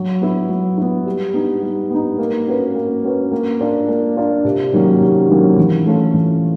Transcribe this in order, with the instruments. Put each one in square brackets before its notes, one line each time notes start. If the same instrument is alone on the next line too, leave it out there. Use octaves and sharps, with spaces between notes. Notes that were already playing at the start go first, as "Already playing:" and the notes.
Already playing: [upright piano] F#3
B3 E4
F#3
B3 E4
G3
B3 D#4
G3
B3 D#4
A#3
C#4 F#4 B4
A#3
C#4 F#4 B4
A#3
D4 F4 A#4
A#3
D4 F4 A#4
C3
D#3 F#3 A#3 C#4
C3
D#3 F#3 A#3 C#4
E3
A3 C#4 F4 A4
E3